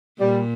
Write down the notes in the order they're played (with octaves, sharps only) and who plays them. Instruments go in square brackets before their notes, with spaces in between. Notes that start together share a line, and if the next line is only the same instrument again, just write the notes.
[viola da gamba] A#2 [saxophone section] G3